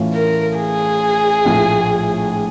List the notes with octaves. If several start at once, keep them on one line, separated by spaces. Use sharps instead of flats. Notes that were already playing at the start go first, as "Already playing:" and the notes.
Already playing: A2 E3 A3 C#4 F4
A#4
G#4
A#1 A2 F3 A3